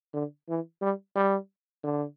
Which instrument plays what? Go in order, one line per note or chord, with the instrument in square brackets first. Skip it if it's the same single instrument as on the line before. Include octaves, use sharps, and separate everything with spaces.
[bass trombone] D3
E3
G3
G3
D3